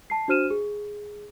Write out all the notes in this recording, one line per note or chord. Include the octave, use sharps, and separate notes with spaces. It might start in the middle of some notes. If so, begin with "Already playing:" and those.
A5 C7
D4 F#4 C5 F6 D#7 E7
G#4